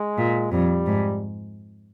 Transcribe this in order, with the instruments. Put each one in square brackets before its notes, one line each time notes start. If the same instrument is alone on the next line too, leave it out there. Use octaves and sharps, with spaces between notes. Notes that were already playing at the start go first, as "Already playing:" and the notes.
Already playing: [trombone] G#3
[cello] A#2
[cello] F2 [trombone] G3
[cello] G#2